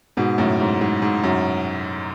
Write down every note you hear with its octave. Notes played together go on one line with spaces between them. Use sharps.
G#2 B2
F#2 A2
G#2
G#2
G#2
F#2